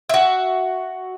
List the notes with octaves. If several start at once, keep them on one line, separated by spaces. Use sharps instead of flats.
F#4 E5